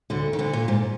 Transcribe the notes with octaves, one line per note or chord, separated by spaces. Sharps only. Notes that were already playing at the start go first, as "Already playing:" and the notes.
D2 D3
D#3
D2 D3
A#2
G#2